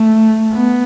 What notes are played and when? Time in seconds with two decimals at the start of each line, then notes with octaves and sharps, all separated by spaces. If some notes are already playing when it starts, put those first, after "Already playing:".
Already playing: A3
0.55 B3